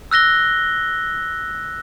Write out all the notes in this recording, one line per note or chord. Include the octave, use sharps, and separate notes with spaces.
E6 F#6 A#6 G7